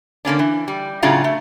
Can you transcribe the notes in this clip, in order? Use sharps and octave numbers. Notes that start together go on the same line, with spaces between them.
D3 A#3 C#4 D4
E3
G3
A2 C#3 F#3 D4 F4 A#5
A3